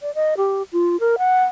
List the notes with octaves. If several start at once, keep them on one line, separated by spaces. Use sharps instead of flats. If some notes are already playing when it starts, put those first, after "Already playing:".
D5
D#5
G4
F4
A#4
F#5